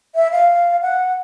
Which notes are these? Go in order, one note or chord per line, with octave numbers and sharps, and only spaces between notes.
E5
F5
F#5